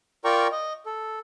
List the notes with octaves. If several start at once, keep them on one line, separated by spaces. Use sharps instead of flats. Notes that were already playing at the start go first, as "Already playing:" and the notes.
F4 A#4 D5 G5 A#5 C#6
D#5
A4